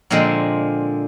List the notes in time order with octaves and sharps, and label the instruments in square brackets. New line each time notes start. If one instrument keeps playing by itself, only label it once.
[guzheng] A#2 D3 F3 G#3 C4